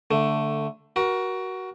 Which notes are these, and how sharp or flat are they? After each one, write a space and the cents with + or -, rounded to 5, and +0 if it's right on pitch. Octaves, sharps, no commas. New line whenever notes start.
D3 +0 A3 +10
F#4 +15 A#4 +30